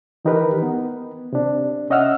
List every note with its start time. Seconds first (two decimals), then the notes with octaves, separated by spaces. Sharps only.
0.25 D#3 E3 D#4 G4 A#4 B4
0.62 B3
1.33 C3 D4
1.90 C#4 D#5 E5 F#5 E6 F6